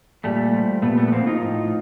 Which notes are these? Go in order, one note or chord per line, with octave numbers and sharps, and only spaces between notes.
A#2 G3 A3
F3
A#2 A3 B3
A3 B3
B3
F3 A#3 C4
D#4 F4
A2